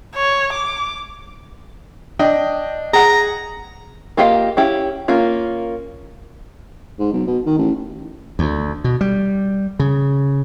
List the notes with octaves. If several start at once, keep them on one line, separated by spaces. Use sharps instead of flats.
C#5
D6
D4 D#5 G5
G#4 F#5 A#5
A#3 F4 G4 D#5 F5
C#4 E4 G4
A#3 C#4 F4
G#2
B1
B2
D#3
A1
D2
B2
G3
C#3